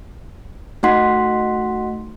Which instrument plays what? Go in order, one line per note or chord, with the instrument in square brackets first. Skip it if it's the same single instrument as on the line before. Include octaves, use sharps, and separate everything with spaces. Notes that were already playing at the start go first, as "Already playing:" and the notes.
[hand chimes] A3 D#4 F#4 F#5 C6 B6